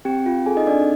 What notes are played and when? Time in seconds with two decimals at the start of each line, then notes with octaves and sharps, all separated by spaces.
0.05 C4 G4 G5
0.26 F4
0.46 G#4 A4 G#5
0.57 D#4 D#5
0.67 C4 D4 D5